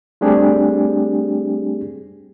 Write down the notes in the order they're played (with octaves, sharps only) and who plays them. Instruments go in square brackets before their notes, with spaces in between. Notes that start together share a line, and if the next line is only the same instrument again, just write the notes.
[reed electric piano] G3 A3 C4 D4 G4 G#4